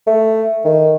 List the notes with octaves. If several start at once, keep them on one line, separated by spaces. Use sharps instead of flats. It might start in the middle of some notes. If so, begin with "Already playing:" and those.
A3
D#3